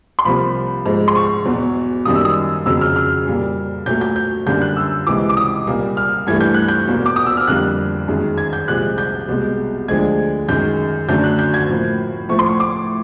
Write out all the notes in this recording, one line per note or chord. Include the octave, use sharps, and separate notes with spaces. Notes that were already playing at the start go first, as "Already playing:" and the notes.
C6
C2 C3 F3 A#3 B5
G#2 F3 G#3
C6
C#6
E2 B2 F#3
F#2 D#3 G3 A#3 D#6
E6
D#6
F2 C#3 F#3 E6
F6
F6
A#2 G3 A#3
A#2 F#3 A3 G6
G6
G6
F#2 D3 G3 A#3 G6
F#6
E6
C#2 C3 E3 D6
D6
D#6
C2 A#2 G3 A#3
F6
G2 E3 A3 G#6
G6
F#6
G6
E2 B2 F#3 A#3
D6
D#6
E6
F6
F2 D3 G3 A#3 F#6
F#2 D#3 G#3
G#6
G6
C2 A#2 F3 G#3 F#6
G6
C2 B2 G#3
D2 D3 F3 G#3 G#6
F#2 D#3 G#3 G6
F#2 D3 F#3 A3 G6
F#6
G6
G#6
A2 F3 A#3
A2 F3 A3 C#6
C6
C#6
D6